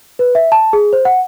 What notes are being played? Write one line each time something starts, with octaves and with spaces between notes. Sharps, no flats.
B4
E5
A5
G#4
C5
F#5